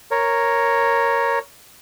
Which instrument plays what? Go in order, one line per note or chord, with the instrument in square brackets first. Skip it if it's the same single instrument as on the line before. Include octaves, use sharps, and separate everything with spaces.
[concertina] A#4 C#5